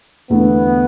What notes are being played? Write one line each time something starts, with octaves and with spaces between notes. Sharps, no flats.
E2 D3 A3 B3 E4